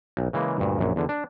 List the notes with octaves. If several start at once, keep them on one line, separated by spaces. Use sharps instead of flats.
B1
C#3 E3 G#3 A#3
D2 G2 A#2
A#1 F#2
E2 D3
D4